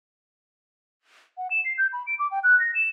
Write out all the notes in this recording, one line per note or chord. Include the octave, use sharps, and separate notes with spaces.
F#5
E7
C7
G6
B5
D7
D6
G5
F#6
A#6
E7